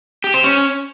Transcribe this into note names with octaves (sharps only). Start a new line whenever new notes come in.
G4
C5
C#4